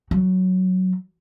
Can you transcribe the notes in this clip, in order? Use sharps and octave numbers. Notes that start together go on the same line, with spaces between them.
F#3